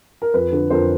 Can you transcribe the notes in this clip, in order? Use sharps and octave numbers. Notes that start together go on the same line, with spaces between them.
A#4
F2 B4
D3
F2 A#4 C5